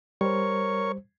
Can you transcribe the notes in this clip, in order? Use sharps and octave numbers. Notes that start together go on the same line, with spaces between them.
G3 A#4 C5 C#5 C#6